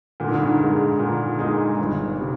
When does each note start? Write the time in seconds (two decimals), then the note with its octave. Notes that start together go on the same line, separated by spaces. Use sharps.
0.20 A#2 D3
0.28 G#2
0.35 G2
0.43 G#2
0.60 G#3 D#4 G#4
0.99 A#2 D3
1.39 G#3 D#4 G#4
1.79 G1
2.20 C3